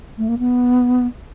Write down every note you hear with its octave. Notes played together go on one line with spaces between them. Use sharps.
A3
A#3
B3